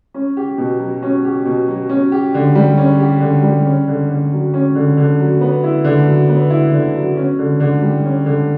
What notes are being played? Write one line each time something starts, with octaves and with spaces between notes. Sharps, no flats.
C#4
G4
B2
F#3
C#4
G4
B2
F#3
C#4
G4
D3
G3
C#4
G4
D3
G3
C#4
D3
D3
F#3
C#4
D3
D3
F#3
B3
E4
D3
F#3
B3
E4
D3
F#3
C#4
D3
D3
G3
C#4
D3